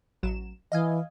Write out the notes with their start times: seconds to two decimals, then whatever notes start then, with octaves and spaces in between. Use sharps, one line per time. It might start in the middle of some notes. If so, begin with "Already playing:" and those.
0.23 A1 F#3 E7
0.72 E3 D#5 F5 G#5